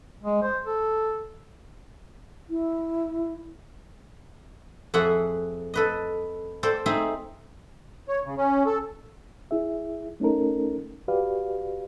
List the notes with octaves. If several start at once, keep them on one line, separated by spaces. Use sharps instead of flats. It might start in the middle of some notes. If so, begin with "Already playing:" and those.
G#3
C5
A4
E4
F2 G#4 E5 F#5 C6
A4 B4 D#5
A4 C5 D5 G5
C4 D#4 G#4 E5 C6
C#5
C#3
C#4
A4
E4 G#4 E5
A3 C#4 D#4 A4 A#4
F#4 G4 B4 D5 F5